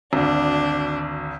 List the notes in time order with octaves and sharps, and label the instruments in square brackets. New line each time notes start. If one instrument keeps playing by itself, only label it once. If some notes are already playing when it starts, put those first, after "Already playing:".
[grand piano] G#1 D2 [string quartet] D4